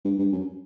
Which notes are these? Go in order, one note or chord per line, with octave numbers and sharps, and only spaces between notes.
G2
G2
F#2